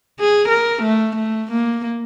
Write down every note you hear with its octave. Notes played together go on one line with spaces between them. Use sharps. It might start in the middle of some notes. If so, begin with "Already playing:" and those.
G#4
A#4
A3
A3
A#3